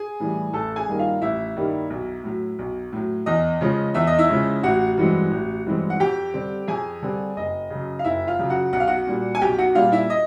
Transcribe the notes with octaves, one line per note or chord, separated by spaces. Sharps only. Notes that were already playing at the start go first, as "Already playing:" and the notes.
Already playing: G#4 G#5
A2 E3 G3
A1 A4 A5
G#4 G#5
G2 D#3 G3 A#3
F4 F5
A1 E4 E5
G2 D#3 G3 A#3
B1
A2 F#3
B1
A2 F#3
E2 D#5
C#3 F3 G#3 C#4
E2 E5
D#5
E4 E5
C#3 F3 G#3 C#4
A1 F#4 F#5
G2 E3 G#3 C4
A1
G2 E3 G#3 C4
F#5
F2 G4 G5
D3 G3 C4
F2 G#4 G#5
D3 G3 C4
F#1 D#5
F#2 C#3
F5
F#1 E4 E5
F4 F5
F#2 C#3
F#4 F#5
B1 F#5
F5
F#4 F#5
A#2 G3
G#5
B1 G4 G5
F#4 F#5
A#2 G3 F4 F5
E4 E5
D#5